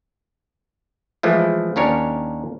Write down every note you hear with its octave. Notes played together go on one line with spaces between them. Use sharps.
E3 F3 G#3 A3
D#2 C#4 D4 A#4 C#5